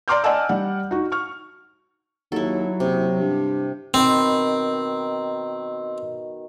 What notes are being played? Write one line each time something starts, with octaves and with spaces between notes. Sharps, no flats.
D5 A#5 C6 D6 F6 G6
D5 D#5 F#5 G#5 A5 E6
G3 D5 F#5
D#4 F#4
C#6 F6
D#2 F#3 E4 A4
F#1 C3
G2
B2 D#3 C4 B5